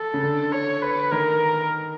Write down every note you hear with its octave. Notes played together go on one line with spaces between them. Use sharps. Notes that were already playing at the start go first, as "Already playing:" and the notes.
Already playing: A4
C#3
D3
C#5
B4
D#3 A#4